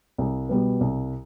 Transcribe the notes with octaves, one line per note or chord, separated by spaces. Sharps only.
C2
B2 G3 B3
C2